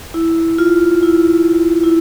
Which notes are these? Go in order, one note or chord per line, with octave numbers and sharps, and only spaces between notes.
E4
F4
E4
E4